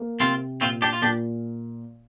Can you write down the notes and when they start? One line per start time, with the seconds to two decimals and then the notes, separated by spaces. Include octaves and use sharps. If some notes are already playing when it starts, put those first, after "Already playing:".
Already playing: A#3
0.20 C3 C4 F4
0.61 A#2 C4 F4
0.82 D4 G4
0.93 F4
1.02 A#2 D4 G4